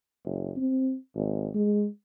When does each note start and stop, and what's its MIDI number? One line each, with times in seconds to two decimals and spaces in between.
0.25 0.51 30
0.57 0.95 60
1.15 1.48 32
1.55 1.86 56